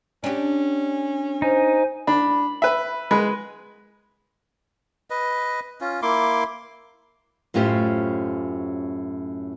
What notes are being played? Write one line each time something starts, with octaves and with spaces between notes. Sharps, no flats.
C#4 D4 G4
D#4 C5 G#5
D4 B5
B4 E5
G#3 B4
B4 D#5
C#4 F4
A#3 E4 C6 D6
F#2 A2 C#4 F4 G4 C5